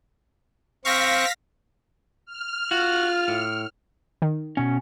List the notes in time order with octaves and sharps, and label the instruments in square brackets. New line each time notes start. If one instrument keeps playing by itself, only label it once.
[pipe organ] C4 C#6 [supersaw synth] F5 A#6 B6
[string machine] F6
[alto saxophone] F4 [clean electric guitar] F#4
[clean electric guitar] A2
[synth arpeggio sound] D#3
[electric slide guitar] B2 C#4